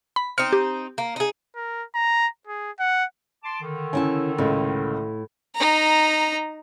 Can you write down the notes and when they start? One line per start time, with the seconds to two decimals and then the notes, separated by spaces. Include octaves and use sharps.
0.16 B5
0.38 C4 D#4 F6 C#7
0.53 G4
0.98 A#3
1.16 D#4 G#4
1.56 A#4
1.94 A#5
2.47 G#4
2.79 F#5
3.43 A5 C6 D6
3.61 D3 D#3
3.93 C#3 E4 G#5 A5
4.38 C#2 A2
5.55 D#4 A#5